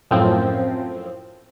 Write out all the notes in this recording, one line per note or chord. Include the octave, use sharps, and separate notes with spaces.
F#2 A2 F3 C4